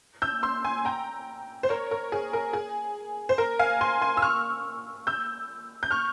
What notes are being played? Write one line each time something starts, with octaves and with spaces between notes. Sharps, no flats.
E6 G6
C6 E6
G#5 C6
G5 A#5
C5
A#4 C#5
A#4
G#4
A#4
G#4
C5
A#4
F5 G#5
G#5 C6
G#5 C6
E6
C#6 F6
E6 G6
G6
C#6 F6